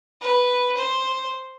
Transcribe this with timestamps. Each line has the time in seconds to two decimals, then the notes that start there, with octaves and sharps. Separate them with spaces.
0.21 B4
0.77 C5